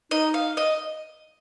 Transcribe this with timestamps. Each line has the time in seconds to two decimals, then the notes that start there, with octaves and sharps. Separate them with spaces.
0.11 D#4 D#5
0.34 F5
0.57 D#5